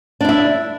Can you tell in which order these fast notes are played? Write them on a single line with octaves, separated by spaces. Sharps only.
D4 E4 E5